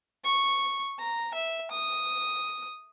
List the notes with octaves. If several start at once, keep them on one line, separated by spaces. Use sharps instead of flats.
C#6
A#5
E5
D#6